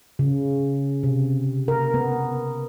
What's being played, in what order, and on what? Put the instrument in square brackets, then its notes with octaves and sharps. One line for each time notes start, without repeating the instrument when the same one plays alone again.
[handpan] C#3
C3
A#4
B3